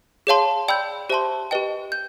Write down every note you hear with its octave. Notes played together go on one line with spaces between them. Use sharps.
G#4 C#5 F5 A5 C6
D5 G5 B5 E6 G6
G4 C5 E5 A5 C6
G4 B4 D#5 G5
G6